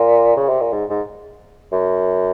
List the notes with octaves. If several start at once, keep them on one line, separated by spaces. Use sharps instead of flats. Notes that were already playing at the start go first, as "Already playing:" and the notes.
Already playing: A#2
C#3
C3
A#2
G#2
G#2
F#2